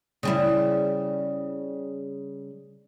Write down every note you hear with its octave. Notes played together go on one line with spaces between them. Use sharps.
C#3 G3 E4